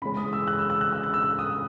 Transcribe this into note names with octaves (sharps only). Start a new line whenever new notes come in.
C#3 E3 G#3 C#4 B5
D#6
E6
F#6
E6
E6
F#6
E6
F#6
E6
D#6